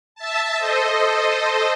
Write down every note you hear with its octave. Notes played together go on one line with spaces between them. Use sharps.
E5 A5
A4 C5 D#5